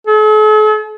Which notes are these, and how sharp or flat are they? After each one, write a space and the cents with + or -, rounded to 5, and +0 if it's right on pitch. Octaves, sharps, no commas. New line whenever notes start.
A4 -45